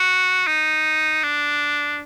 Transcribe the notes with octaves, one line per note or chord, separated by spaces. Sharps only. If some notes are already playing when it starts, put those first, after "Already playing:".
Already playing: F#4
D#4
D4